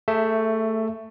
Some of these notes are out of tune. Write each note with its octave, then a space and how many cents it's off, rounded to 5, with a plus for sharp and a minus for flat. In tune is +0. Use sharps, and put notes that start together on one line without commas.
A3 +15 G#4 +0 E5 +0